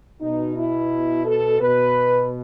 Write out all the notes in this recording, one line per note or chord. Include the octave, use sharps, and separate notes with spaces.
B2 D#4
E4
A4
B2 B4